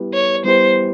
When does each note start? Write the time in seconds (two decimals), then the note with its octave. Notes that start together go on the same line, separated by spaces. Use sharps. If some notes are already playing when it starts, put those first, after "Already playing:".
Already playing: G3 B3 E4 G4 B4
0.13 C#5
0.44 G3 B3 E4 G4 B4 C5